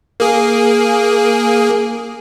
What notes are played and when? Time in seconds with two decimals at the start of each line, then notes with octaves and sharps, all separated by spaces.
0.20 A#3 G#4